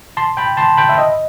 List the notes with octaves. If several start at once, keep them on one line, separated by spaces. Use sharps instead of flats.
A5 C6
G5 B5
A5 C6
G5 B5
E5
D#5